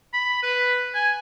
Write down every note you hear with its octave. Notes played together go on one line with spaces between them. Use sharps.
B5
B4
G#5